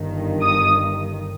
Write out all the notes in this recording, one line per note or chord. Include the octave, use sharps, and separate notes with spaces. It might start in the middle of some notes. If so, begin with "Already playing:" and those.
Already playing: G1 G2 D#3
D#6